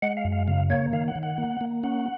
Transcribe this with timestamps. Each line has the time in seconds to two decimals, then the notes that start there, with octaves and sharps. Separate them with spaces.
0.02 G#3 F#5
0.17 F5
0.25 F#2
0.32 F5
0.47 C#3 F5
0.70 A#3 C#5
0.93 D#3 F5
1.08 F#5
1.16 D#3
1.23 F#5
1.38 A#3
1.61 A#3
1.83 C#4 F#5